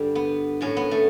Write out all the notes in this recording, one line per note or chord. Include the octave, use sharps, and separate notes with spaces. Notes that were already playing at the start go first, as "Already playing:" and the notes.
Already playing: G2 D3 G3
B3
A2 F#3 C#4
B3
A3